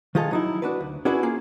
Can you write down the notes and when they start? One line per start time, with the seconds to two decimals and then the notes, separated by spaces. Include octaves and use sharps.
0.15 D#3 F3 F4 G#4 A4
0.31 F#3 D#4 E4
0.62 D4 F#4 B4
0.81 D2
1.05 C#4 D4 E4 F#4 G#4 B4
1.23 A#3 F4 G#4